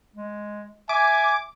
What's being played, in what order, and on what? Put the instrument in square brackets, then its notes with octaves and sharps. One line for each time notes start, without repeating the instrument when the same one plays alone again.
[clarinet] G#3
[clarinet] E5 [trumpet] G#5 [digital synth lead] D6